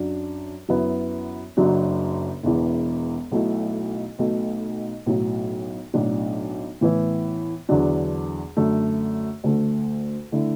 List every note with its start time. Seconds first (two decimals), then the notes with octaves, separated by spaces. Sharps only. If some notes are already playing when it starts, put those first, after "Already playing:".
Already playing: F#2 F#3 D4
0.68 F#2 F#3 B3 E4
1.57 F#1 F#2 F#3 D4
2.43 E1 E2 E3
3.31 B1 B2 F#3 A3 E4
4.19 B1 B2 A3
5.06 B1 A2 F#3
5.94 B1 A2 F#3 D4
6.81 A2 E3 B3 E4
7.69 E2 D3 F#3 D4
8.57 F#2 D3 A3
9.44 D2 D3 A3
10.32 D3 A3 E4